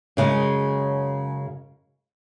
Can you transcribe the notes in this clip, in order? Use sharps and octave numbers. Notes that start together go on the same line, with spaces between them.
F#2 C#3 G#3